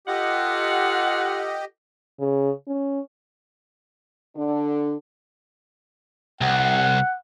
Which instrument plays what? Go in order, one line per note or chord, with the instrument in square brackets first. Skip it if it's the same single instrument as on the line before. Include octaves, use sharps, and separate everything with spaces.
[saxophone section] F4 A4 F#5 [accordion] G4 D#5
[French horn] C#3
C#4
[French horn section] D3 D4
[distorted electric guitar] C2 [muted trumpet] F#5